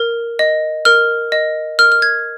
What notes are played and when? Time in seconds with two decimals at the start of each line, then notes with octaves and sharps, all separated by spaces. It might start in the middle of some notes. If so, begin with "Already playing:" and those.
Already playing: A#4
0.39 D#5
0.85 A#4 F6
1.32 D#5
1.79 A#4 F6
1.92 F6
2.02 G#6